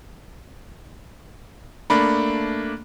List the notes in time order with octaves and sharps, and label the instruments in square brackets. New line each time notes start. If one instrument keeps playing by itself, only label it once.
[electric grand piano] A3 A#3 D4 [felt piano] B5